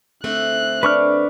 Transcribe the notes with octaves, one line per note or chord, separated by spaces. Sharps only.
D3 A3 C4 F#6
D4 B4 C#6 F6